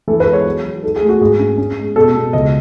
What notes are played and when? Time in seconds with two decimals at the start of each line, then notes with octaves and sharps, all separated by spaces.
0.08 E3 A4
0.20 B4
0.27 G#3
0.33 C#5
0.46 F#3
0.65 F#3
0.83 D#4 A4
0.96 G#4
1.02 A3
1.09 F#4
1.21 G#2 G#4
1.39 C#4
1.58 C#4
1.77 G#3
1.96 B2 A4
2.15 B2
2.33 C#2 D#5